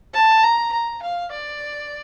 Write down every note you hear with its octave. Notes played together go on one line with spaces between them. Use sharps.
A5
A#5
A#5
F5
D5